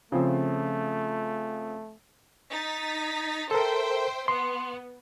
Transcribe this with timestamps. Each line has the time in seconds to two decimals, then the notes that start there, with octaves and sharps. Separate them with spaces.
0.12 C#3 F3 A3 C4
2.50 D#4 A6 B6
3.51 A4 A#4 C5 E5 G5
4.28 B3 C6